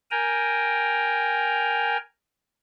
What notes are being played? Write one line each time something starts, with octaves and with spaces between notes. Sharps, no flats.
A#4 G5 G#5 A#5